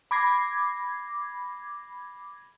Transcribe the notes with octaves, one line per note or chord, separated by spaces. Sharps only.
B5 D6 G#6 A#6 C7